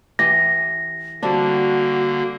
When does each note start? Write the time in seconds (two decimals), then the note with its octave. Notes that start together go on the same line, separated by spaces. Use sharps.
0.19 E3 G4 A#6
1.23 D3 G3 A#3 C4 D4 F#4